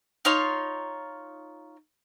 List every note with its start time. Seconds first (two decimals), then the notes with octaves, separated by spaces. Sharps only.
0.25 D#4 F4 C#5 C6